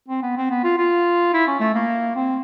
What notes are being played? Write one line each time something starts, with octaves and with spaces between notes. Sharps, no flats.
C4
B3
C4
B3
F4
F4
E4
C#4
A3
A#3
C4